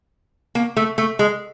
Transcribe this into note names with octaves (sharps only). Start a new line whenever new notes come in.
A#3
A3
A3
G#3